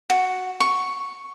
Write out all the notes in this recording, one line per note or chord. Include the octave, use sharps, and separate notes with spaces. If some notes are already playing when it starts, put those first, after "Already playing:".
F#4
C#6